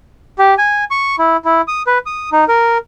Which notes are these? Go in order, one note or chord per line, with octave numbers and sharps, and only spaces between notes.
G4
G#5
C#6
E4
E4
D#6
B4
D#6
D#4
A#4